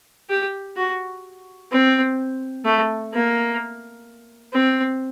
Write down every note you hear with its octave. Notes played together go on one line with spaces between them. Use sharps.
G4
F#4
C4
A3
A#3
C4